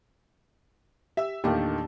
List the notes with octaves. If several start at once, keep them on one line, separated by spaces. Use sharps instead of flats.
G4 E5 E6
E2 A#2 D#3 A3 A#3 D4 G4 A5